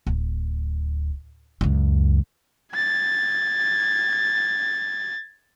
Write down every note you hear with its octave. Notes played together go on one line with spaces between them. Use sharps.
D1
C#2 F#2
G#6 A6